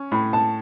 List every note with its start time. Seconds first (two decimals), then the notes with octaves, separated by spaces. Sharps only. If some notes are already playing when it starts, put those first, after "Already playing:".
Already playing: C#4
0.12 A2 B5
0.33 A5